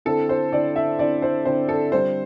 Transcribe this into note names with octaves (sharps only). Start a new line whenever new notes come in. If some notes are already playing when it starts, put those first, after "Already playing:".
D3 C4 E4 A4
C5
D3 C4 E4 D5
E5
D3 C4 E4 D5
C5
D3 C4 E4 C5
A4
D3 G3 C4 C5